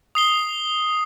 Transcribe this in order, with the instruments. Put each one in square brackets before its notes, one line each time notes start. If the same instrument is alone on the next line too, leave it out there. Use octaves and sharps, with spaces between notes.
[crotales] D#6 C7 G7